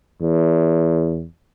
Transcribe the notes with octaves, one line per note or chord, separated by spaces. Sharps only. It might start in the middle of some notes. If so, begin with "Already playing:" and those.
E2